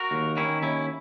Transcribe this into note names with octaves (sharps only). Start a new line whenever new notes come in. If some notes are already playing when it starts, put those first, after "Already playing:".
Already playing: F#4 A#4
D#2
D#3 C#4 E4
D#2 C#4 E4